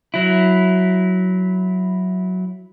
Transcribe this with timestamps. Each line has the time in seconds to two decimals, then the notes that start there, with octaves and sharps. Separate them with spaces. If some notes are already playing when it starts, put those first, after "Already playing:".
0.14 F#3 E4